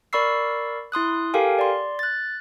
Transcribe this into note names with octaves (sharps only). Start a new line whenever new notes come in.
A#4 D5 B5 C#6 E6 C7
E4 C6 D#6 F#6
G4 A4 A#4 F5 G5 G#5
D5 C6
F#6 A6